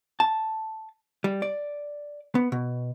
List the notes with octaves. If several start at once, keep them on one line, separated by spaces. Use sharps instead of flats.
A5
G3
D5
B3
B2